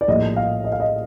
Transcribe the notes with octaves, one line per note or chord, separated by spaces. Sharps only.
D5
A#1 A2 G3 D#5
F5
D#5
F5
D#5